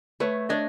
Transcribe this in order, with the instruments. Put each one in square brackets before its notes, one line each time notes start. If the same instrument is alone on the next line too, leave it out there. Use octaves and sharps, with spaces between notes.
[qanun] A3 [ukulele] B4 C#5
[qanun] D4 [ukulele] C#5 D#5